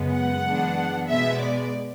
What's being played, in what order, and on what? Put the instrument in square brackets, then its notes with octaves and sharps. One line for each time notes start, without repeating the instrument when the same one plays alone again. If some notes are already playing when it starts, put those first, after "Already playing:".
Already playing: [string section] F#2 C#3 G#3 B3
F#5
F#2 E3 G#3 B3 D4
B2 G#3 B3 E5
D5